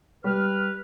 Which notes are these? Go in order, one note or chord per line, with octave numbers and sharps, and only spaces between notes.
G3 B4 F6